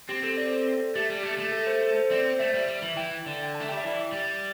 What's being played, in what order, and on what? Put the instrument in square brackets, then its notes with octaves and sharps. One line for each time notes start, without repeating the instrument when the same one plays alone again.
[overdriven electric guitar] C4 [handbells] G4
[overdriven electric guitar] C4 [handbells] A4
[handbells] D5
C5
A4
[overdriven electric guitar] A3 [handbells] G4
[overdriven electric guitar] G3
[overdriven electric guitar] A3 [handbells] G4
[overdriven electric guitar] A3
[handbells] A4
C5
A4
C5
[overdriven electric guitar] C4 [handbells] D5
[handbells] C5
[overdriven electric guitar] A3 [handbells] E5
[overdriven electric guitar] G3
G3
E3
[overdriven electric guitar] E3 [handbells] G5
[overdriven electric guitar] D3
[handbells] G5
A5
[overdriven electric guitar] A3
[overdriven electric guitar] G3 [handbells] G5
[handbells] E5
[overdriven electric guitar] E3 [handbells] D5
[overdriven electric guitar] G3